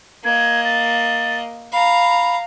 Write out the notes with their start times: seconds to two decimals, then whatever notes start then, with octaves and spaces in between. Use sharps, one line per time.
0.24 A#3 D#5 G#6
0.64 A6
1.72 F5 A#5 B5